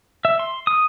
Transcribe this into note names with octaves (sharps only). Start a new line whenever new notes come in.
E5
C6
D#6